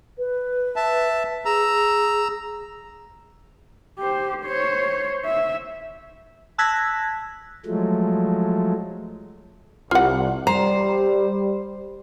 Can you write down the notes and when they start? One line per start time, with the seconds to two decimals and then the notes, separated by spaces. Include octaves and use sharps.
0.18 B4
0.76 E5 A5
1.45 G#4 A#5 E6
3.99 G4 C5
4.42 C5 C#5
5.25 E5
6.58 A5 E6 F#6 G#6 A#6 B6
7.66 F3 F#3 G#3 A3
9.91 C2 F4 F#5
10.47 G3 C5 A#5